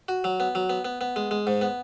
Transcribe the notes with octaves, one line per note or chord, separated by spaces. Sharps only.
F#4
F#3
B3
F#3
B3
B3
B3
G#3
G#3
G#2
B3